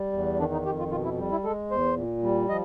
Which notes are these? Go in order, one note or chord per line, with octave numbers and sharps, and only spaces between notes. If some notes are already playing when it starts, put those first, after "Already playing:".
Already playing: G3
E2
D#3 D4
D#4
F2 G4
F4
B2 F4
E4
G3
E4
G#3 A4
E2 C5
A#2
G3
F3 D#5